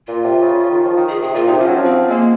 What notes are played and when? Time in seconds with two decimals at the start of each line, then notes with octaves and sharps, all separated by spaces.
0.08 A#2 F4
0.24 C3
0.41 C#3
0.59 C#3
0.70 D#3
0.84 F3
0.97 D#3
1.09 G#4
1.22 C3 G#4
1.34 A#2 F4
1.47 C3 D#4
1.59 F3 C#4
1.67 F#3
1.76 F3
1.84 C4
2.10 G#3 A#3